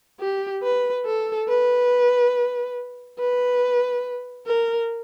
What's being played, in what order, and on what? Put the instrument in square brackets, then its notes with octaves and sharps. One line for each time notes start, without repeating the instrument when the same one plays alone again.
[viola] G4
B4
A4
B4
B4
A#4